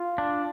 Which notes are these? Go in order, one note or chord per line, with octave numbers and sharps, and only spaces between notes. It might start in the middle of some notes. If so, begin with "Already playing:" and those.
Already playing: F4
D4